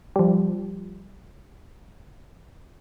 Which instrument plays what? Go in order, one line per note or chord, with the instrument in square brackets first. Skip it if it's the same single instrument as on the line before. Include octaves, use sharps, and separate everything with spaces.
[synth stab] F3 G3